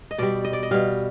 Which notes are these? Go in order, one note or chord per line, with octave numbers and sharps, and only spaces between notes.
D#5
B2 G3 D5
D#5
D5
D#5
B2 G3 F5